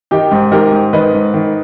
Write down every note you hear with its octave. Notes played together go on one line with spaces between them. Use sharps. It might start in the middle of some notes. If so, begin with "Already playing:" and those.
D#3 D#4 G4
G#2
D#3 G4 A#4
G#2
D#3 B4 D#5
G#2
D#3